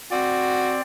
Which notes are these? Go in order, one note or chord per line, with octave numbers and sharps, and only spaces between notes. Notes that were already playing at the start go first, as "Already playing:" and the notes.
C4 F#4 D5